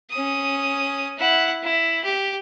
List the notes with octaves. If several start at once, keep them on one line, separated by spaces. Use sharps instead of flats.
C#4 D#6
E4 F#5
E4
G4